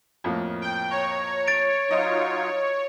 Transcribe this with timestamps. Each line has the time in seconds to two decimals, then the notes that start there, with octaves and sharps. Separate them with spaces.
0.24 F2 A2 A#3
0.61 G5
0.90 C#5 A#5
1.48 A6 D7
1.91 F#3 D#4 F4 D#5